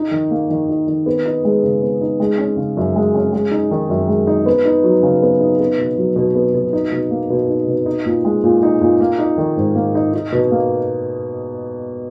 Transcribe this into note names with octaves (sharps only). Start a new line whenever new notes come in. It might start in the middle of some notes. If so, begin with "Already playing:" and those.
Already playing: D#4
D#3
A#3
D#3
D#4
D#3
B3
D#4
G#3
C#3
B3
D#4
G#3
C#4
C#3
F#2
G#3
C#4
G#3
D#4
D#3
F#2
G#3
D#4
B3
D#4
F#3
C#3
B3
D#4
B3
B2
F#3
B2
B3
B2
D#4
B2
A#3
B2
D#4
B2
D#4
A#2
G#3
A#2
D#4
A#2
A#3
D#4
D#3
G#2
A#3
D#4
D#4
B2
A#3